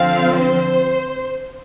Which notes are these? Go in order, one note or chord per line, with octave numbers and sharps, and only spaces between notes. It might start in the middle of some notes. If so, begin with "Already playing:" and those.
Already playing: D3 F3 C4 F5
C5